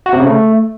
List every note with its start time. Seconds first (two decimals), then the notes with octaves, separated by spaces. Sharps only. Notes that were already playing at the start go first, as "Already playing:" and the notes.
0.06 F#4
0.13 C3
0.20 C#3
0.26 A3